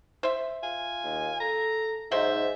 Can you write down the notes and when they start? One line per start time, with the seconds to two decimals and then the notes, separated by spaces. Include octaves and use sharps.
0.23 C5 E5
0.63 F4 G#5
1.03 D#2
1.40 A4 A#5
2.11 G#2 F#3 D#4 C5 E5